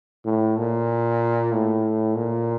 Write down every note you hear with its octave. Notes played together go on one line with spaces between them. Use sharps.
A2
A#2
A2
A#2